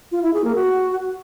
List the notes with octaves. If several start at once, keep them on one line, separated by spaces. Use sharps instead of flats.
F4
E4
G#4
A#3
F#4